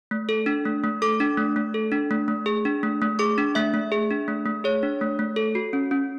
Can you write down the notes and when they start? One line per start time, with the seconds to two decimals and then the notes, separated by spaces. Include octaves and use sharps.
0.11 A3
0.29 A4
0.46 D4
0.65 A3
0.84 A3
1.02 A4 D6
1.20 D4
1.37 A3
1.56 A3
1.74 A4
1.92 D4
2.11 A3
2.28 A3
2.46 G#4
2.65 D4
2.83 A3
3.02 A3
3.19 G#4 D6
3.38 D4
3.55 A3 E5
3.74 A3
3.92 G#4
4.10 D4
4.28 A3
4.46 A3
4.64 G#4 C#5
4.83 D4
5.01 A3
5.19 A3
5.36 A4
5.55 F#4
5.73 C#4
5.91 C#4